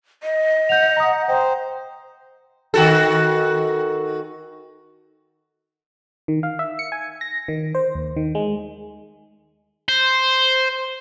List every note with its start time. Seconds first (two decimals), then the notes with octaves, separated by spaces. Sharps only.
0.23 D#5
0.69 F#5 G6 F7
0.97 A#5 D#6
1.28 C5 G5 A#5
2.74 D#3 F#4 A4
6.28 D#3
6.43 F5
6.59 E5
6.79 C#7
6.92 G#5
7.21 A#6
7.48 D#3
7.75 C5
7.95 D#2
8.17 D#3
8.35 G#3
9.88 C5